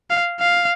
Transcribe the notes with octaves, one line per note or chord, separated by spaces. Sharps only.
F5
F5